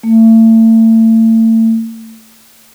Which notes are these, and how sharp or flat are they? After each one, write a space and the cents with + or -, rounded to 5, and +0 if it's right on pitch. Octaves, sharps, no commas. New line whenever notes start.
A3 +35